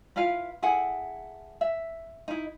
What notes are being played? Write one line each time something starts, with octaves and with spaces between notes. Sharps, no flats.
E4 F4 B4 F5
E4 G#4 A4 F#5
E5
D#4 E4